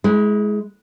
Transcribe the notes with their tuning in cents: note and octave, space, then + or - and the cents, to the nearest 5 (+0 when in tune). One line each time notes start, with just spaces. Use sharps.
G#3 +15 E4 -20